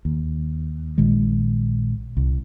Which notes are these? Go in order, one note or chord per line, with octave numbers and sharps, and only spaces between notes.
D#2
A#1 A#2 D#3 G#3
C2